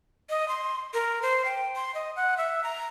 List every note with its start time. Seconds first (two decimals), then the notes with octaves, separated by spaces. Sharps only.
0.30 D#5
0.49 C6
0.94 A#4
1.22 C5
1.45 G5
1.76 C6
1.95 D#5
2.16 F#5
2.38 E5
2.64 A#5